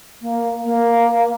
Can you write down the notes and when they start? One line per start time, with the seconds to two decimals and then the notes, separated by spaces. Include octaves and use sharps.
0.21 A#3
0.64 A#3